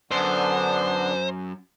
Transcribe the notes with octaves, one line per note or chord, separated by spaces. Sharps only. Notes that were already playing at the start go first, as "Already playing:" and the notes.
F#2 D3 B3 D4 C5